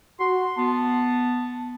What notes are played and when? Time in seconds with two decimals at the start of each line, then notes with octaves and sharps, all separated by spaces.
0.20 F#4 C6
0.58 B3 A5